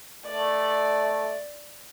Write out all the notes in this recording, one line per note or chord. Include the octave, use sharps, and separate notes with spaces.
A3 D5